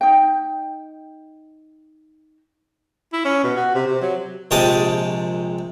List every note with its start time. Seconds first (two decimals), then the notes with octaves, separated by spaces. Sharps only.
0.01 D#4 G5
3.13 E4
3.25 C#4
3.44 B2
3.57 F#4
3.75 C3
3.87 C3
4.01 F#3
4.51 A#1 C3 G#3 G5 A5 D#6